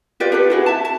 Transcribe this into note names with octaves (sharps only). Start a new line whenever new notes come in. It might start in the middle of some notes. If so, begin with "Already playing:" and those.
F4 G4 B4 D5
G4 A4 B4
E4 F#4 G#4
E5 A5
A5